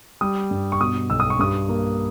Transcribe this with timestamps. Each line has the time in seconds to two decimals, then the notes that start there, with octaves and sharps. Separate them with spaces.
0.21 G3 D#6
0.51 G2
0.72 C#6
0.81 B2 D#6
1.10 B1 E6
1.20 D#6
1.30 C#6
1.39 G2 D#6
1.69 A#3